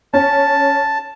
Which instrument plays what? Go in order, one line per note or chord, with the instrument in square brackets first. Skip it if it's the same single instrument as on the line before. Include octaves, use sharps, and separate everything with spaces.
[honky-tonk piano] C#4 [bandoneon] A5